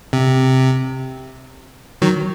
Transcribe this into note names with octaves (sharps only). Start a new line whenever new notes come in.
C3
D#3 F#3